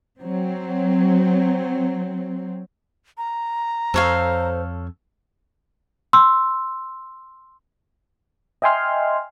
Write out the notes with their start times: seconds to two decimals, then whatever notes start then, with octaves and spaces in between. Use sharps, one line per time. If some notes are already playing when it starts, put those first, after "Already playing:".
0.20 F#3 C4
3.18 A#5
3.94 F2 A4 C5 C#5 F5
6.13 C6 E6
8.62 D#5 E5 G5 G#5 C6 F6